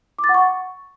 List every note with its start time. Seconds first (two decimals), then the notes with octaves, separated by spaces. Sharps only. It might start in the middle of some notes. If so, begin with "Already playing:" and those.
0.19 D6
0.24 A6
0.29 F#5
0.34 C#6